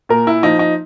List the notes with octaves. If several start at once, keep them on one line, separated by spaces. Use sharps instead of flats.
A#2 A#4
E4
F3 D#4
D#4